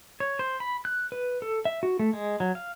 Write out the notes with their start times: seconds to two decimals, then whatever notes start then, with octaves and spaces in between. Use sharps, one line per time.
0.20 C#5
0.39 C5
0.60 B5
0.85 F#6
1.12 B4
1.42 A4
1.65 E5
1.83 F#4
1.99 A3
2.13 G#3
2.40 F#3
2.55 F5